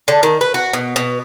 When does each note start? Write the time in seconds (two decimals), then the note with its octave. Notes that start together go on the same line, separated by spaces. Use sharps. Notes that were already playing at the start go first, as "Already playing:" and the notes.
0.08 D3
0.23 D#3
0.41 B4
0.54 F#4
0.73 B2
0.96 B2